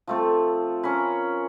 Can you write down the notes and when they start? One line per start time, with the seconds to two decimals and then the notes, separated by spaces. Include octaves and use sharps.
0.07 F3 A3 C4
0.83 C#4 A#4 B5